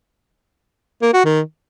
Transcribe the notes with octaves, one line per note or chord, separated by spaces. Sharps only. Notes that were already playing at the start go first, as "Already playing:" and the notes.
A#3
F#4
D#3